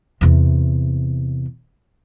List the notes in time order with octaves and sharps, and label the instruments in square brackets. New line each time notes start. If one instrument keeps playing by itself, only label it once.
[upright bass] E2 C3